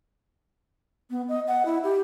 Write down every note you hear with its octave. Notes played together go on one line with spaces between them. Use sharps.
B3
D#5
F#5
E4
G4